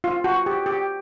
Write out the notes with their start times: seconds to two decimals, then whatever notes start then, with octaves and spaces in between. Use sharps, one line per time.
0.04 F4
0.24 F#4
0.46 G4
0.66 G4